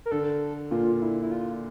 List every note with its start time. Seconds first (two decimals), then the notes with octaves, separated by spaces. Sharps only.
0.06 A#4
0.11 D3 A4
0.71 A#2 F4
1.02 E4
1.22 E4
1.32 F4